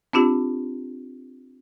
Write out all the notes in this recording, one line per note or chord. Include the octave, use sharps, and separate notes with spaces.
C4 D4 F4 G4